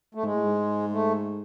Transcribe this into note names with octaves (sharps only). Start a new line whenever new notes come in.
A3
G#2 G#3
A2
G#2
A3